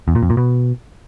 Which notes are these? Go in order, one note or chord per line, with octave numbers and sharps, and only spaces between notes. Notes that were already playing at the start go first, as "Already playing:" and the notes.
E2
A#2
F2
A#2
B2